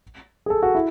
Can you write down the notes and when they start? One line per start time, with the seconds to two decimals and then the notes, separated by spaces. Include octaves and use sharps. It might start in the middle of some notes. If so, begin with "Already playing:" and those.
0.46 G#4
0.50 A4
0.63 F#4
0.75 E4